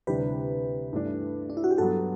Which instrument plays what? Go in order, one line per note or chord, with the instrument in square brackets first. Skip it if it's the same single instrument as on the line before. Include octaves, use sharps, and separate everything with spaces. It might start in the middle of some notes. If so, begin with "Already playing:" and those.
[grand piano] D2 C3 E3 G3 D4 [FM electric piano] G4 B4
[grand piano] G2 E3 A3 D4
[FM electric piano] D4
E4
F#4
G4
[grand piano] G2 F#3 B3 [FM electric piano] F#4 A4